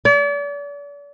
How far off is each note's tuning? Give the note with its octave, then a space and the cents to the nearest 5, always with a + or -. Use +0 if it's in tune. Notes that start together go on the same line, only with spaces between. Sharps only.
D5 -40